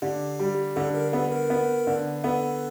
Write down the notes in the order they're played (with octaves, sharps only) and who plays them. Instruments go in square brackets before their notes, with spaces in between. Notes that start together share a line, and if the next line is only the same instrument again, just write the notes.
[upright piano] D3 [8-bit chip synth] G4
[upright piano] G3
[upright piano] D3 [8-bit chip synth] A4
[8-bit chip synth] A#4
[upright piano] B3 [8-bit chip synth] A4
[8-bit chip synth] A#4
[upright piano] B3
D3
[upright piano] B3 [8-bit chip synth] A4